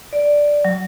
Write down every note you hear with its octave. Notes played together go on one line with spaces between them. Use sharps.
D5
F#3